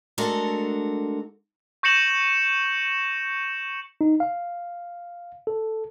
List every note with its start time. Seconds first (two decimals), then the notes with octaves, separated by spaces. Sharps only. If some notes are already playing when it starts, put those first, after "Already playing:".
0.18 G#3 A3 D4 F#4 A4 A#4
1.83 C#6 G6 A#6 C#7 E7 F#7
4.01 D#4
4.20 F5
5.47 A4